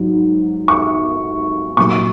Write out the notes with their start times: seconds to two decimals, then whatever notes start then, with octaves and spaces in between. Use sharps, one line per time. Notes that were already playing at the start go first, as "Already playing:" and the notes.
Already playing: G#2 F#3
0.68 C#6
1.77 A#2 F#3 C#6